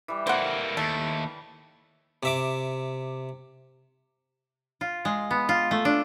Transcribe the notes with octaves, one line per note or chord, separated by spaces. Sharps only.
E3 G3
A#3 A4 C5 F#5
D#2 A3
C3 E5 D6
F4
G#3
B3
F4
A3
D4